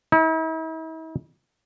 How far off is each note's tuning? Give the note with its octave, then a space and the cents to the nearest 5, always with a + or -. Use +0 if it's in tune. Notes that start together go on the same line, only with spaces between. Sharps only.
E4 -45